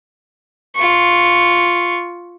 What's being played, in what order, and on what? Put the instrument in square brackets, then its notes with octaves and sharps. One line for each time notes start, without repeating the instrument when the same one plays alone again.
[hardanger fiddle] F4 C#6